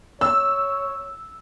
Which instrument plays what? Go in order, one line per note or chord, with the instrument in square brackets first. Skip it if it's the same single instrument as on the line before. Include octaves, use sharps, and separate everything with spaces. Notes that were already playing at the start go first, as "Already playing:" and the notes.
[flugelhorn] C#5 [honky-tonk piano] E6